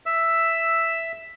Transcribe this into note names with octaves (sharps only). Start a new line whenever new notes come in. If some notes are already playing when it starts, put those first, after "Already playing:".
E5 E6